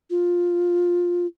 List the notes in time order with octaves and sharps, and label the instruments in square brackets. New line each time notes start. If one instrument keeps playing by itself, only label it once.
[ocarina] F4